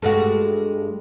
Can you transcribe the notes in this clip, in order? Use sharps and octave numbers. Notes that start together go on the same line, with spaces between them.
G2 G#3 F#4 A4